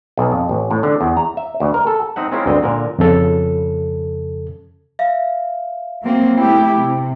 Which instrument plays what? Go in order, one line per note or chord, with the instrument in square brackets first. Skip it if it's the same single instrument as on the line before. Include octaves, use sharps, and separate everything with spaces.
[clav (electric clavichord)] B1
F2
A1
A2
D3
E2
A#5
E5
D2
A#4
A4
C4 D#4 E5 F#5
G#3 C4 C#4 E4 F4 A#4
D2 G2 D3 C4 D#5
A#2 D3 A#4
[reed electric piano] F2 C#3 A4
[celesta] E5 F5
[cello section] F#3 A#3 C4
[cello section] A3 E4 G4 [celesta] G5
[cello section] C3